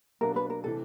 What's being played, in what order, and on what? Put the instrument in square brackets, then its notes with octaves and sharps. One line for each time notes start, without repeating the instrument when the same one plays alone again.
[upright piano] B2 F#3 A#3 D4 [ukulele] A#4
[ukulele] B4
A#4
[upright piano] C3 E3 A3 [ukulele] A4